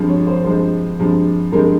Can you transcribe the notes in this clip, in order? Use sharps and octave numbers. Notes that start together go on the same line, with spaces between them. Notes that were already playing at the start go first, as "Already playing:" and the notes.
Already playing: G2 F3 G#3 C4
C#5
C5
G2 F3 G#3 C4 C5
G2 F3 G#3 C4
G2 F3 G#3 C4 A#4